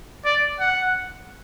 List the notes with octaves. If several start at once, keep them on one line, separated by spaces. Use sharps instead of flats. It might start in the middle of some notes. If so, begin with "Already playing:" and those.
D5
F#5